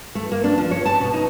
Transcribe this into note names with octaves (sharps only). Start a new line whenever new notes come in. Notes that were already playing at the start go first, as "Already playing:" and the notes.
A3
A#3
D4
F3
C#5
A5
B2
D#4